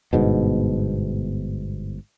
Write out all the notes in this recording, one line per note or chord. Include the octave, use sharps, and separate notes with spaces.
G1 G#2 B2